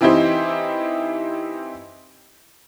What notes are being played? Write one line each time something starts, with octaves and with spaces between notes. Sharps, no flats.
E3 C4 D#4 E4 G4 C5